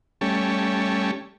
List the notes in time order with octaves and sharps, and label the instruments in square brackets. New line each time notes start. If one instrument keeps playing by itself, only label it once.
[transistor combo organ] G3 A3 C#4